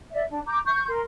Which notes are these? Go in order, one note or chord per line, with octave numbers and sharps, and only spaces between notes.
D5 E5
D4
A#5 D6 G6
C#6 G6
A#4 C6